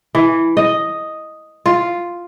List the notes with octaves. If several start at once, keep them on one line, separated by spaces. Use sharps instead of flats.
E3
D#5
F4